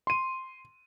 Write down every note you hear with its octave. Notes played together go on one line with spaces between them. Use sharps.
C6 D#7